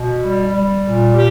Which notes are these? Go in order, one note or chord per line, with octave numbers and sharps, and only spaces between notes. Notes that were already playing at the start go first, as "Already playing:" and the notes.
Already playing: B2
G3
G3
A#2
G4